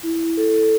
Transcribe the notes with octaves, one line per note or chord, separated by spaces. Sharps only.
E4
A4